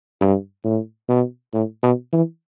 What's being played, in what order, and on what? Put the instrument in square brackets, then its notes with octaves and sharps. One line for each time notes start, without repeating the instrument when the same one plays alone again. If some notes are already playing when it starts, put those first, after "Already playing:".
[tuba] G2
A2
B2
A2
B2
E3